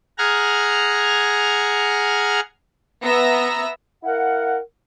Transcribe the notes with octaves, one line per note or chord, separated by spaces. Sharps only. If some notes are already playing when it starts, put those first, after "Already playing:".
G#4 F#5 A#5 F6 G#6
B3 E5 A#5 E6 A#6
E4 A#4 F5 F#5